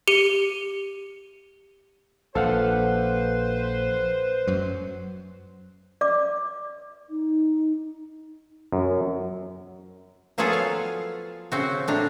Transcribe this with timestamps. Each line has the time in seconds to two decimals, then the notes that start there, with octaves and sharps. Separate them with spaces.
0.08 G4 C#7 D#7 G7
2.35 A#1 A4 B4 C5 F5 F#5
4.47 F#2 F#3
6.01 D5 D6
7.10 D#4
8.72 F#2
10.38 F3 F#3 B3 F4 G#4 A4
10.53 F5
11.52 C#3 C4 F#4
11.88 A2 D4 A#5